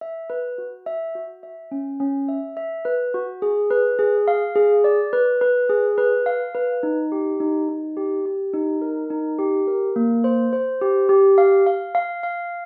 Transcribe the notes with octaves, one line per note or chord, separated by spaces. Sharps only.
E5
B4
F#4
E5
F#4
E5
C#4
C#4
E5
E5
B4
F#4
G#4
B4
G#4
F5
G#4
D5
B4
B4
G#4
B4
F5
B4
D#4
G4
D#4
D#4
G4
G4
D#4
A#4
D#4
G4
A#4
A#3
C5
C5
G4
G4
F5
F5
F5
F5